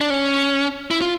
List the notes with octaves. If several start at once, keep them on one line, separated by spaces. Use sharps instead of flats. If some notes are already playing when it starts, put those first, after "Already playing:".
D4
C#4
E4
F4